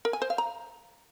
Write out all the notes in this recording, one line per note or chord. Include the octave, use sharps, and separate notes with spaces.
A#4
G#5
C5
F5
A#5